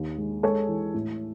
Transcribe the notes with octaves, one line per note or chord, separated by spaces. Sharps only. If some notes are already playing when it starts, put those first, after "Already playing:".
Already playing: D#2
G#3
G#3 A4 C#5
E3
A2